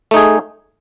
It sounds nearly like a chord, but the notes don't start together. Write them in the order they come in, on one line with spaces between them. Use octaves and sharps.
A3 D#4 G#4